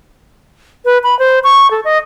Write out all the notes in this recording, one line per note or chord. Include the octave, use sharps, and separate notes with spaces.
B4
B5
C5
C#6
A4
D#5